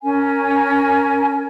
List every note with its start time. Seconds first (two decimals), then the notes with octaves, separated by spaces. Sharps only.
0.03 C#4 A#4 G#5